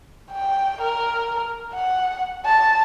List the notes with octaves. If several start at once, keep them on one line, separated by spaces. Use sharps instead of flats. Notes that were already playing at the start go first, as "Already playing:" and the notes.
G5
A#4
F#5
A5